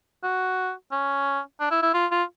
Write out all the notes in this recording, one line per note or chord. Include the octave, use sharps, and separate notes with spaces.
F#4
C#4
D4
E4
E4
F4
F4